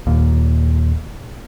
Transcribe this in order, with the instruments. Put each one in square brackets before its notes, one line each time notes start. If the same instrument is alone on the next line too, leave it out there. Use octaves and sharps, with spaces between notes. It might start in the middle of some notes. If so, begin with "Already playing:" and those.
[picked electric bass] D#2 A#2